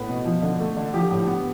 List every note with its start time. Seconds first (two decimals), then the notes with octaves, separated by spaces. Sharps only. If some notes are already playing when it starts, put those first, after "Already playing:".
Already playing: A2 B3 B4
0.09 B2
0.25 F3
0.42 D3
0.60 A3
0.77 D3
0.94 F3 G4
1.11 A2
1.27 B3